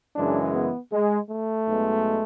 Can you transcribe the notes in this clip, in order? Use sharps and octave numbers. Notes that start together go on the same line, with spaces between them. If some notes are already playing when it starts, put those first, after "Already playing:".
F#2 C#3 E3 G#3 D4
B3
G#3
A3
B1 B2 G#3